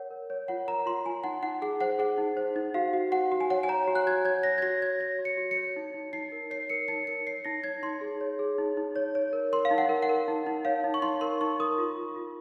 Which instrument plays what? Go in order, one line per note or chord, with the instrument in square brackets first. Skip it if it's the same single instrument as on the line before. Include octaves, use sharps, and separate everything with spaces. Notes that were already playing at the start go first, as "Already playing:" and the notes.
Already playing: [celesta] A#4 C#5 F#5
A#4
C#5
F4 F#5
A#4 A#5
F4 C6
F4 G#5
D#4 F#5
D#4 F#5
G#4 F#5
C5 F#5
G#4 F#5
D#4
C5
D#4
F#4 F5
F#4
F#4 F#5
F#4
G#5
C#5 F#5
G#5
C#5 A#5
F#4
F#6
F#4 G#6
C#5 G#6
C#5 A#6
G#6
F#4 A#6
C#5 G#6
C#5 A#6
F#4
C#7
F#4
C#7
C#5
D#4
D#4
D#4 C7
A#4
C#5 C7
A#4 C#7
D#4 C#7
A#4 C#7
C#5 C7
D#4 A#6
C#5 G#6
D#4 C6
G#4
C#5
G#4
D#4
D#4
C#5
C#5
A#4
A#4 C6
F5
D#4
F#5
A#4
F#5
A#4
D#4
D#4
C#5 F5
D#4
C#6
D#4 C6
A#4 C6
D#4 C#6
A#4 D#6
F4
F4
F4